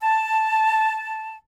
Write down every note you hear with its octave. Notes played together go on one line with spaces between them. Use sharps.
A5